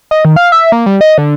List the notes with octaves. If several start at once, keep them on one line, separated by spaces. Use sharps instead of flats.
D#5
D#3
F5
E5
A#3
G3
D#5
D3